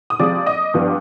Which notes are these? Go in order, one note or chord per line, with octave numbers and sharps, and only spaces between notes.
D#6
C3 F3 G#3 D5 D6
D#5 D#6
G2 F3 B3 D4